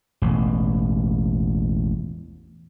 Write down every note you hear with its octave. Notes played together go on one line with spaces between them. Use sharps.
E1 A1